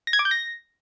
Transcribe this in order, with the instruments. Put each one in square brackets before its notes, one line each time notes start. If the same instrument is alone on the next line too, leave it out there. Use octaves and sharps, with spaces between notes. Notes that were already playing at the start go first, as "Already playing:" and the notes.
[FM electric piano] A#6
G#6
D6
G6
A#6